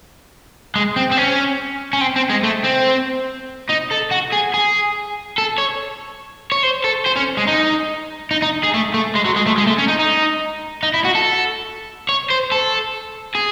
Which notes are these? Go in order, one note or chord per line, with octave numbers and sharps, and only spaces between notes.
G#3
C4
C4
C#4
C#4
C4
C4
G#3
A3
C4
D#4
A4
F#4
G#4
G#4
A4
C#5
C#5
C5
A4
C5
C#4
G#3
D#4
D#4
D#4
G#4
A3
A3
G#3
F#3
G#3
A3
G#3
A3
C#4
D#4
D#4
D#4
E4
F#4
A4
C#5
C5
A4
G#4